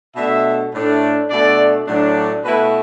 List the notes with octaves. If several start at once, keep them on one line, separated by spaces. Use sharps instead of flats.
B2 A3 D4 E5
A2 A3 D4
B2 A3 D4 D5
A2 F#3 D4
B2 A3 E4 B4